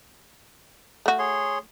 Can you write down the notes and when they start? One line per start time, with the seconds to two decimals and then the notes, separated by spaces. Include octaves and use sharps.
1.06 A3 F#4
1.19 G#4 C#5 C6